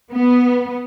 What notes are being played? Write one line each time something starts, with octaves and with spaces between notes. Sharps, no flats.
B3